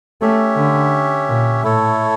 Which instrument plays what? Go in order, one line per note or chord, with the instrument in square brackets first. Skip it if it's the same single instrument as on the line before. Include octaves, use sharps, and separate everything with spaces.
[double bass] A3 [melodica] C#4 G4 C#5 E5
[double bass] D3
A#2
[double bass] A2 [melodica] A3 E4 A4 C#5